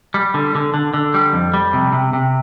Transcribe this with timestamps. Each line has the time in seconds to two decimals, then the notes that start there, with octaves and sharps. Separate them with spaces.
0.14 G3
0.34 D3
0.55 D3
0.74 D3
0.94 D3
1.14 G3
1.33 F2
1.54 G3
1.73 C3
1.92 C3
2.13 C3